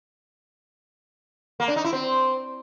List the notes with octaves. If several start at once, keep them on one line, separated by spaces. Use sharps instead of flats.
A#3
D4
D#4
E4
C4